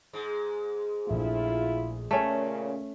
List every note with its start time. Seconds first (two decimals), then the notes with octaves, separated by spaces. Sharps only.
0.13 G#2 G#3
1.07 A#1 A3 E4 F4
2.11 A#2 C#3 A3 C#4 E5